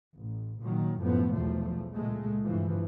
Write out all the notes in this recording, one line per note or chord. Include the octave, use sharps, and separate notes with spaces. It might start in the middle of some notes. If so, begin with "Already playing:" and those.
A1
A#2 D#3 F#3
F#2 A2 F3 B3
B1 E2 F3 A3
C#2 A#2 G#3 A3
G2 E3 F3